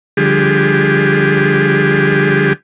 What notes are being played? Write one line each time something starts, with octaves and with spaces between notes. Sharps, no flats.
D3 F3 G3 G4 G#4